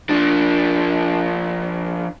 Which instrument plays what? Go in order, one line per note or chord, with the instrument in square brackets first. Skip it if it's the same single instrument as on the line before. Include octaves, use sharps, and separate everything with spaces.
[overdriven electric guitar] F3 D4